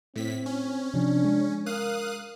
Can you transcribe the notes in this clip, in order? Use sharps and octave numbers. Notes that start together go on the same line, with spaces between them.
A2 C4 B6
C#4
C3 F3 D4
G#3
A#4 F5 D#6 F#6